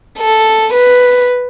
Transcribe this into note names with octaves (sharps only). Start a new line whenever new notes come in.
A4
B4